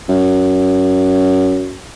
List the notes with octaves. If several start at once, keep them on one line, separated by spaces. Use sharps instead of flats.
F#2